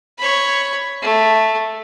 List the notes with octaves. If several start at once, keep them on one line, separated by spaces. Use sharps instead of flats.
C#5 B5
A3